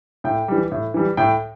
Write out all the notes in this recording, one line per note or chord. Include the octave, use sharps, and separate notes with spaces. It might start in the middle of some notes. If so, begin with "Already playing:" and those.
A2 G5
E3 G3
A2
E3 G3
A2 G5